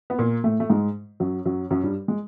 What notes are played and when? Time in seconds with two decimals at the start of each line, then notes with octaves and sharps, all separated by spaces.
0.10 B3
0.19 A#2 A#3
0.44 A2 A3
0.60 A3
0.70 G#2 G#3
1.20 F#2 F#3
1.45 F#2 F#3
1.70 F#2 F#3
1.83 G2 G3
2.08 G#3